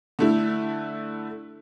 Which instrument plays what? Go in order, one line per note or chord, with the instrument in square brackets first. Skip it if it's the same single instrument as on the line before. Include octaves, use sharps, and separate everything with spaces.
[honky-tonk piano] D3 A3 E4